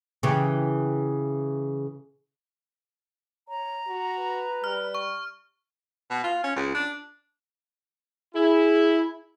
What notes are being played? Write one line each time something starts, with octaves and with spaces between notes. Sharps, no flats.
C#3 E3 G4
C#5 A#5
F#4
B4
G3 F6
C#6
B2
F4
C#4
C#2
D4
E4 G#4